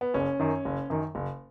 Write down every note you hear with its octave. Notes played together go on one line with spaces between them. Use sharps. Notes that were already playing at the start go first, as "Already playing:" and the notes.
B3
F#1 C#4
F#2 D#3
F#1
F#2 D#3
F#1